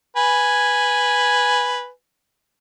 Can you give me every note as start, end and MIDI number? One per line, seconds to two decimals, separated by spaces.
0.17 1.89 71
0.17 1.89 80